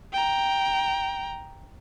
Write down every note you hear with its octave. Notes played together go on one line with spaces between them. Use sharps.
G5 A#5